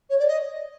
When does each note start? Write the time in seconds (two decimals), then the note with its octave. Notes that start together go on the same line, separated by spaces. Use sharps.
0.09 C#5
0.18 D5
0.27 D#5